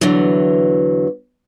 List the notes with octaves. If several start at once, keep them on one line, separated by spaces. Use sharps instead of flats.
E2 D3 E3 F#3